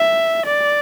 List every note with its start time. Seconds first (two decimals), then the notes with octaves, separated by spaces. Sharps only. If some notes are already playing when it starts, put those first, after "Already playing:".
Already playing: E5
0.46 D5